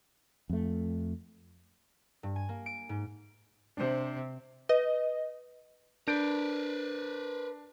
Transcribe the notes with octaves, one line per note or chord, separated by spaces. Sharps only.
F2 A3
G2
G#5
A#3
D7
G#2
C3 D4 C5
B4 D#5
D4 A#4 B4 G6 D7